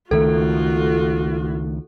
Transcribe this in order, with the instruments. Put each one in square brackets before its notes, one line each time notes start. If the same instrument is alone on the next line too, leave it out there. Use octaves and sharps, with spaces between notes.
[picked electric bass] C#2 D#3 A3 [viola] F4 F#4 [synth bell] A4